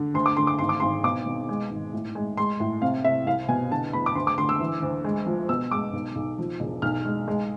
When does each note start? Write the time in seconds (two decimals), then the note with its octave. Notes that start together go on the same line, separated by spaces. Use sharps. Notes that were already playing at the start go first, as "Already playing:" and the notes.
Already playing: D3
0.14 D2 C6
0.26 D6
0.37 D3 C6
0.47 D6
0.59 G#1 C6
0.69 D6
0.80 G#1 C6
1.04 B2 D6
1.26 B2
1.49 G#3
1.70 G#1
1.93 A2
2.15 G#3
2.37 G#3 C6
2.60 A2
2.82 C3 F5
3.04 C3 E5
3.27 C2 F5
3.48 B2 G#5
3.71 D3 A5
3.93 E2 B5
4.06 D6
4.15 D2 C6
4.27 D6
4.38 D3 C6
4.49 E6
4.60 E3
4.82 D2
5.04 G#3
5.26 F3
5.49 B2 E6
5.71 G#3 D6
5.93 B1
6.16 B1
6.39 F3
6.60 E1
6.82 B1 F6
7.05 G#3
7.28 G#3